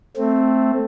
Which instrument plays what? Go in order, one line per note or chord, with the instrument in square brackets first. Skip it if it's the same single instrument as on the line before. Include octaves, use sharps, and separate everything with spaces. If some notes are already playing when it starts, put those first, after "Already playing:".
[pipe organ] A3 C4